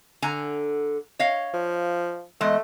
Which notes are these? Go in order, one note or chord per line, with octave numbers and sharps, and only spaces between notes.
D3 G#5 A#5
C#5 D#5 F5
F3
E2 G#3 A3 D#5